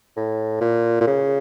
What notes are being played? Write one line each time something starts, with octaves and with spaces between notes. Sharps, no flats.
A2
A#2
A#2
C#3